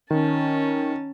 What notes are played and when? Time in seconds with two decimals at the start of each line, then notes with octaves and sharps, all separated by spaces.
0.11 D#3 C#4 A5